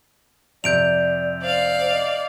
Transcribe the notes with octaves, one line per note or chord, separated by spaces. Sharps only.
F2 C3 D5 G6 D7 F7
C5 D5 F5
D#5